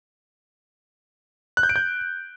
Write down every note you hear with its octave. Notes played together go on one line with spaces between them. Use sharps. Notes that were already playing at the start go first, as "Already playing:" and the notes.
F#6
G6
D7
G6